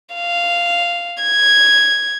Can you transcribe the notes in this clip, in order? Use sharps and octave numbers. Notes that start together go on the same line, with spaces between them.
F5
G#6